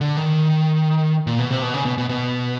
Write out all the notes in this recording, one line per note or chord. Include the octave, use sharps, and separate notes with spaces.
D3
D#3
A#2
B2
C3
B2
C#3
B2
B2
B2